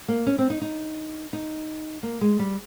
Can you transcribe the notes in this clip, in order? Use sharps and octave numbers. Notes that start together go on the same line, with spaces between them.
A#3
C#4
C4
D#4
D#4
D#4
A#3
G#3
G3